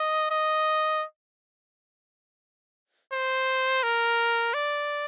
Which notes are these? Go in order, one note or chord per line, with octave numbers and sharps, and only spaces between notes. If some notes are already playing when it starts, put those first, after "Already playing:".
Already playing: D#5
D#5
C5
A#4
D5